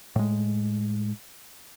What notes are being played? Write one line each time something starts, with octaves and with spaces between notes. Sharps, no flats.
A2 G#3